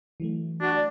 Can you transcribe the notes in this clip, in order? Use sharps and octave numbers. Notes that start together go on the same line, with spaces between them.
E3 F#3 A3
D4 F#4
D5